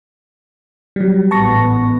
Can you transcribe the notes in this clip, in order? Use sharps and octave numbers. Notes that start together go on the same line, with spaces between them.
F#3 G3
A1 G#2 B3 A5 C#6 A#6